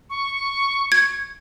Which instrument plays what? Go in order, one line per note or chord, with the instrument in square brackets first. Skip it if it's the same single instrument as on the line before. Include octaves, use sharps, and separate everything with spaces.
[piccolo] C#6
[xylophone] G#6